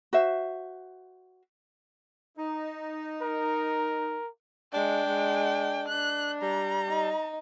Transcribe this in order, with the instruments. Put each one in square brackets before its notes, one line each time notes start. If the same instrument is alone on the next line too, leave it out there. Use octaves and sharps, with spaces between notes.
[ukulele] F#4 C5 E5
[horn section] D#4
[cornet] A#4
[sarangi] G#3 [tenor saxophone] D4 [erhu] G5
[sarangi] G#3
[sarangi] D4 [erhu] F#6
[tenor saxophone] G3 [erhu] A#5
[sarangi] D#4